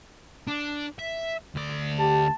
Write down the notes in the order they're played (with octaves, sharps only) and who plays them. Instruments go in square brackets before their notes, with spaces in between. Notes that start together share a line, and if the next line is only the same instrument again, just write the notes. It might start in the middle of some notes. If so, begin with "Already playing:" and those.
[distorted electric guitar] D4
E5
D2 D5
[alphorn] G4 [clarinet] A5